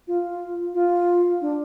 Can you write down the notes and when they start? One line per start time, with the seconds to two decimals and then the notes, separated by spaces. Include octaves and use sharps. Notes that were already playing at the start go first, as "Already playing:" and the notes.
0.08 F4
0.74 F4
1.41 D4